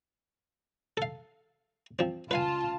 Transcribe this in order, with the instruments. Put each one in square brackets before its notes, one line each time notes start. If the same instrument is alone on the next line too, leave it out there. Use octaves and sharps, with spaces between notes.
[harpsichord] A4 F5
F3 C4
[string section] C#2 F4 A5 [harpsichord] B4 F5 G#5